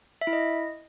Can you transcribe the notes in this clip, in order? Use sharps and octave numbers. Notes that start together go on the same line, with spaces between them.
E5
E4
D#5